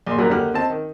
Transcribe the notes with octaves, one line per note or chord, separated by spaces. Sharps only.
A#1 C6
G#1 F#2 F#3 G3 A#4
D#2 D3 A#3 G4 F#5 F6
C4 D#5 A5
D#3